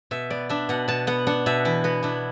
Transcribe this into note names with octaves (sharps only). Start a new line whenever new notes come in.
B2 E5
B3 D5
D4 E5
B2 F#5
B2 A5
B3 F#5
D4 F#5
B2 E5
E3 E4
B3 F#4
D4 E4